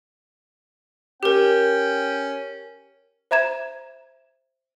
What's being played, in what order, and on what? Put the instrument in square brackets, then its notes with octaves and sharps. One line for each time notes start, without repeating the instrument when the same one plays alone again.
[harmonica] C#4 G5 [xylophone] G4 A#4
[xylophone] C5 E5 A#5 G#6 E7